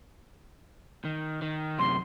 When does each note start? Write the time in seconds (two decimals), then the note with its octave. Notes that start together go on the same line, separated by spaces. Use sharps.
1.05 D#3
1.42 D#3
1.79 F#2 C3 C6